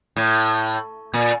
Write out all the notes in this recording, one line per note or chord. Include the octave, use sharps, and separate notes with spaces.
A2
A#2